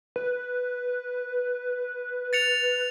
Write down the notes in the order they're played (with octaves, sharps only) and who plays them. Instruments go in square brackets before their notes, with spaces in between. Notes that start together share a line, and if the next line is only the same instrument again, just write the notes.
[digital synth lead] B4
[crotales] A6 C#7 F7